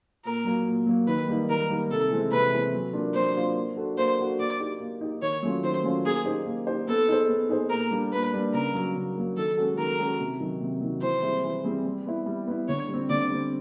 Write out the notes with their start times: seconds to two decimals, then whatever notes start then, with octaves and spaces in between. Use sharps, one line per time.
0.25 A#2 A#4
0.45 F#3 A#3
0.67 A#2
0.86 F#3 A#3
1.07 D#3 B4
1.28 G3 A#3 D#4
1.49 D#3 A#4
1.70 G3 A#3 D#4
1.91 C3 A4
2.11 E3 G#3 C4
2.32 C3 B4
2.52 E3 G#3 C4
2.73 F#3
2.93 A#3 D4 F4 A#4
3.14 F#3 C5
3.35 A#3 D4 F4 A#4
3.56 A#3
3.77 D4 F#4 A4
3.98 A#3 C5
4.18 D4 F#4 A4
4.39 A#3 D5
4.60 D#4 G4
4.80 A#3
5.01 D#4 G4
5.22 D#3 C#5
5.43 F#3 A3 C#4 F4
5.63 D#3 C5
5.84 F#3 A3 C#4 F4
6.05 A#3 G#4
6.25 D#4 G4 C5
6.46 A#3
6.67 D#4 G4 C5
6.88 B3 A4
7.08 D#4 G#4 C5
7.29 B3
7.49 D#4 G#4 C5
7.70 A#2 A#4
7.91 G3 A#3 D4
8.12 A#2 B4
8.33 G3 A#3 D4
8.54 C#3 A#4
8.74 F#3 A#3
8.95 C#3
9.16 F#3 A#3
9.36 D#3 A4
9.57 G#3 C#4 F#4 A4
9.77 D#3 A#4
9.99 G#3 C#4 F#4 A4
10.19 C3
10.40 D#3 F#3
10.61 C3
10.81 D#3 F#3
11.02 E3 C5
11.22 G3 C4 E4 G#4
11.44 E3
11.64 G3 C4 E4 G#4
11.86 G3
12.06 B3 E4
12.26 G3
12.47 B3 E4
12.68 D3 C#5
12.88 G3
12.93 C4
13.10 D3 D5
13.30 G3 C4